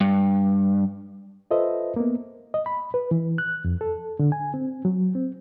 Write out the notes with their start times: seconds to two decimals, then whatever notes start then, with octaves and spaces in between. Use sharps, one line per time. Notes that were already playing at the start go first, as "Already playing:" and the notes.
0.01 G2
1.51 F4 A4 B4 C5 D#5 E5
1.96 A#3 B3
2.54 D#5
2.66 B5
2.94 B4
3.11 E3
3.38 F#6
3.64 F2
3.81 A4
4.19 D3
4.32 G#5
4.54 C4
4.85 F#3
5.15 C4